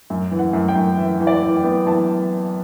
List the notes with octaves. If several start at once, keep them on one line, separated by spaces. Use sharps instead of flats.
F#2
E3
F#5
F#2
G5
F#2
E3 E5
E3
D5
E3
G5
B3
E3 A5